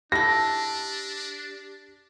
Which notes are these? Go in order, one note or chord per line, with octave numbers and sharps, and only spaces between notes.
D4 E4 G4 A4 A#6